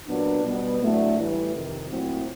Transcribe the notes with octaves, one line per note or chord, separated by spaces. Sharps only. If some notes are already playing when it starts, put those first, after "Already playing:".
A#2 F#3 B3 D4
B2 G3 B3
A2 F#3 A3 D4
A2 E3 G3
F2 C3 D#3
A#2 F#3 A3 C4 E4